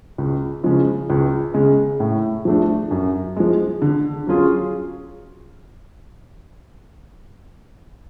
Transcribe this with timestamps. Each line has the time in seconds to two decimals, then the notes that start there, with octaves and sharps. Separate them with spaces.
0.18 C#2
0.64 C#3 F3 G#3
1.10 C#2
1.54 C#3 G#3
2.00 A2
2.45 F3 A3 D4
2.91 F#2
3.36 F3 G#3
3.82 D3
4.27 F#3 C#4 F4 G#4